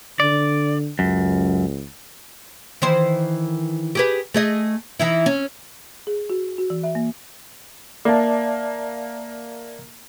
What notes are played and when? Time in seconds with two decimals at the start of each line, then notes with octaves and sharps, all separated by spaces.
0.20 D3 D5
0.99 C#2 F#2
2.82 D#3 E3 C5
3.95 G4 G#4 B4
4.34 A3 G#4 D#5
5.00 E3 D#4 E4
5.26 C#4
6.07 G#4
6.30 F#4
6.58 F#4
6.70 E3
6.83 E5
6.95 A#3
8.05 A#3 D5 E5 A5